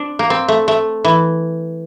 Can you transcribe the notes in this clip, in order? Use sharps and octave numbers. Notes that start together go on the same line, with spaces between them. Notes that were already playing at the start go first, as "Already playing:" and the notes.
Already playing: C4 D4
A#3
C4
A3
A3
E3